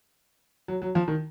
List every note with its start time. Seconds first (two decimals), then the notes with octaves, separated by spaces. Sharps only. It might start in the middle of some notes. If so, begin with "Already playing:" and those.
0.68 F#3
0.82 F#3
0.95 F3
1.08 D#3